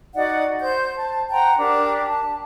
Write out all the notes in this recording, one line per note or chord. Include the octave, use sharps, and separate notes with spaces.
D#4 F#4 D5 F#5
C5 G6
A5
C5 F#5 G5 A#5
D4 G4 A#4
A5